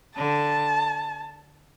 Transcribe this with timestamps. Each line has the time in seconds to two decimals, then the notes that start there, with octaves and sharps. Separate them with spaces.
0.16 D3 A5